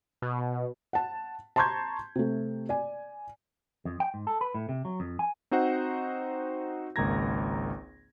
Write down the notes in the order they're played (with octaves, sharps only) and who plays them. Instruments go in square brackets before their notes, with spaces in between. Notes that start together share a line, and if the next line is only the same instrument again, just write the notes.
[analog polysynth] B2
[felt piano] F#5 A5
A5 A#5 C6 C#6 G6 G#6
C3 A3
D5 G#5
[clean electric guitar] F2
G5
G#2
A4
B4
A2
C3
F#3
F2
G#5
[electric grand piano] C4 D#4 F#4 C5 F#5
G#1 C#2 A#3 A#5 G#6 A#6